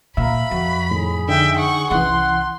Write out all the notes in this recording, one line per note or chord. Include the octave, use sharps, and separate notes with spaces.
A#2 E5 F5 A#5 B5
F2 F#4
A2 D#3 G#4
D3 D#4 E5 G5
F#5 C#6
C2 E3 C#4 F#5 C6